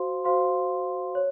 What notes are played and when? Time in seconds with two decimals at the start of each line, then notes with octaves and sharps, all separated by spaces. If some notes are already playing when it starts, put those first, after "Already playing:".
Already playing: F#4 C5 F5 C6
0.24 F#4 C5 F5 C6
1.15 C#5